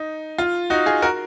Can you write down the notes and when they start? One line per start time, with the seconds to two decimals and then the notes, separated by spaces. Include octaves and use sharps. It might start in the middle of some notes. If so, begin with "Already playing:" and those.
Already playing: D#4
0.38 F4
0.70 D#4 F#4
0.86 F4 G#4
1.02 F#4 A#4